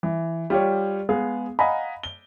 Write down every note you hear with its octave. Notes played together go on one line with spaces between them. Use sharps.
E3
G3 F4 G4 C#5
G#3 B3 G#4 F5
D#5 F5 F#5 G#5 A#5 B5
G7